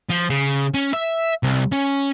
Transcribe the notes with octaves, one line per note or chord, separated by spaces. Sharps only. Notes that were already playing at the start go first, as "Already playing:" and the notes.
F3
C#3
C#4
E5
C2
C#4